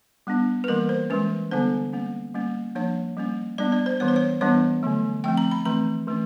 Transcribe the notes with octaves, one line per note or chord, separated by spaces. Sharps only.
G3 B3 D4
B4
E3 G3 A#3 A#4
C5
E3 G#3 C#4 B4
D3 G3 B3 D4 C5
G3 A#3 C#4
G3 A#3 C#4
F3 A#3 D4 C#5
G3 A#3 C#4
G3 B3 D4 D5
D5
C5
E3 G3 B3 D4 C#5
C5
C#5
E3 G3 B3 D4 C#5
D3 F#3 A3
F3 A3 C4 G5
A#5
B5
E3 A3 C4 A#5
E3 A3 C#4